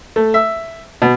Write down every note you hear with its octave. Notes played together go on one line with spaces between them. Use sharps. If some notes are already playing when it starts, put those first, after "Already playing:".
A3
E5
B2